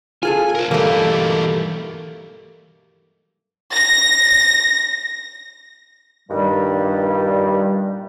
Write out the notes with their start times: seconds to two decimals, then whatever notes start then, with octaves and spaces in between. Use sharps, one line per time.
0.23 F4 G#4 A4 G#5
0.55 A#4 C5
0.71 B1 G2 E3 A3 A#3 G4
3.73 A#6
6.29 G2 A#2 D#3 G3